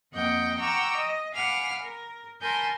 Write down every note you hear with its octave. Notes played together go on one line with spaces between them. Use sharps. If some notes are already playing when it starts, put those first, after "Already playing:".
F2 A#3 D#5 F#5 G5 G6
F#5 G5 A#5 C#6 D6 E6
D#5
F5 F#5 G#5 B5 D6 F6
A#4
A#4 G#5 A5 B5 C6 G6